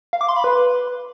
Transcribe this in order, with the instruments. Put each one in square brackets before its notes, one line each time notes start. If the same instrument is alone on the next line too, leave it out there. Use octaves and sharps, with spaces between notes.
[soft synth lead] F5
D6
C6
B5
B4